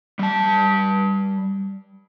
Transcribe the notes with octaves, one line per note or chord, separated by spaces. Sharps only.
G3 A5